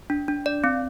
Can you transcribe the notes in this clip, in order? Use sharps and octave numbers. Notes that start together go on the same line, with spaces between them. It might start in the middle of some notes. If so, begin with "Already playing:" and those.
D4
D4
D5
C4